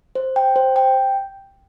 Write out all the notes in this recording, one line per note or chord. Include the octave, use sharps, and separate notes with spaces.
C5
G5
C5
G5